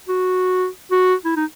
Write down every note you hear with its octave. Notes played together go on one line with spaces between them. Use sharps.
F#4
F#4
E4
D#4